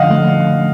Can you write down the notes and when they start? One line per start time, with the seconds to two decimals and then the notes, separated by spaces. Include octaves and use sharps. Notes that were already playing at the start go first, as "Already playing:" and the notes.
Already playing: D3 F3 D#5 F5 F#5
0.10 A3